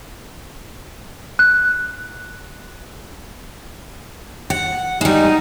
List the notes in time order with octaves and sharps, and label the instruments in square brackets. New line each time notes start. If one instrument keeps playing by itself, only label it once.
[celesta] F#6
[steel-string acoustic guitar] F#5
[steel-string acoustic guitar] G3 G#3 [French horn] D#4